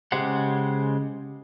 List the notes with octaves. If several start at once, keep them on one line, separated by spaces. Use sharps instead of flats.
C#3 G#3 G4 C5 F#5